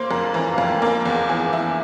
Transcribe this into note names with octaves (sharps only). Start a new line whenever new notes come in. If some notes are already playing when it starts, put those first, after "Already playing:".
Already playing: A#3 C5 C6
F2 A#4 A#5
E3 A#4 A#5
F5
F2 G5
G#5
A#3 A#4 A#5
E2
E3 G#4 G#5
E4